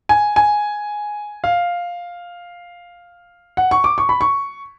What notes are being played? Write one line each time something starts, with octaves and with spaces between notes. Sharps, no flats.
G#5
G#5
F5
F#5
C#6
D6
C#6
B5
C#6